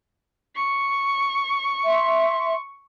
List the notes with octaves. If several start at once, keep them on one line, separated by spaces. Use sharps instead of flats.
C#6
E5 C6